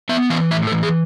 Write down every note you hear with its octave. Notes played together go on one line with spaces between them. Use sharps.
B3 E5
E3 F5
A2 E5
A4
E3
G#4